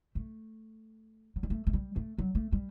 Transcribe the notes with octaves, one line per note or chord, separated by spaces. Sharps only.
A3
F#3
G3
A3
A3
G3
A3
F#3
A3
G3